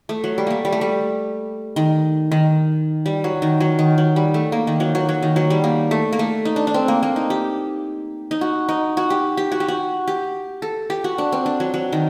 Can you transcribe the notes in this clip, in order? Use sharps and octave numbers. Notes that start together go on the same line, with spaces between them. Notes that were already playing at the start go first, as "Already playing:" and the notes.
A3
F#3
G3
A3 A#3
G3
A3
G3
D#3
D#3
G3
F#3
D#3
F#3
D#3
F#3
G3
A3
A#3
D#3
F#3
F#3
F#3
D#3
F#3
G3
A#3
A3
A#3
A3
D#4
D4
D4
C4
A#3
A#3
D#4
G4
D#4
F#4
D#4
F#4
G4
G4
F#4
G4
F#4
G4
A4
G4
F#4
D4
C4
D4
F#3
F#3
D#3